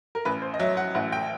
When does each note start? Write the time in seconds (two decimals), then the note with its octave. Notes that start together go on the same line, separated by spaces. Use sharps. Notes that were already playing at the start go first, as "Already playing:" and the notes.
0.15 A#4
0.25 A1 B4
0.42 C5
0.54 D#5
0.60 F#3 E5
0.77 F#5
0.95 A1 F#5
1.12 G5